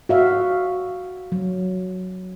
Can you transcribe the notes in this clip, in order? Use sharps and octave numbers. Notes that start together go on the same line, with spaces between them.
F#4 E5 F5
F#3